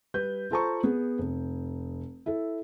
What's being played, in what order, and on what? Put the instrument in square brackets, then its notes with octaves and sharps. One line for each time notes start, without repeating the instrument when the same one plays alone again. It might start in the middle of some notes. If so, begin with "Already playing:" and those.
[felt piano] G3 B4 G6
F4 A4 C5 A5 A#5 C#6
B3 G#4
F1
E4 A4